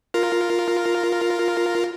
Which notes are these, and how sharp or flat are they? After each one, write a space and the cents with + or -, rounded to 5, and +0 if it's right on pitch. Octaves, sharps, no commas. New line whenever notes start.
F4 +0 A#4 +0